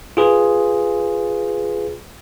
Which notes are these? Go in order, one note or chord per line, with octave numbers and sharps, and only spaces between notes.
F4 G#4 B4